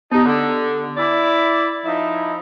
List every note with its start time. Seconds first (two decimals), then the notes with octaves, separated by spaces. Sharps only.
0.11 B3 D#4 G4
0.25 D3
0.97 E4 D5
1.85 F3 D#4 E4